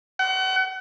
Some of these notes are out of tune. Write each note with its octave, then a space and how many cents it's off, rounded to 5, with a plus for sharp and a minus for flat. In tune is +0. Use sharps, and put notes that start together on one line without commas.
F#5 +35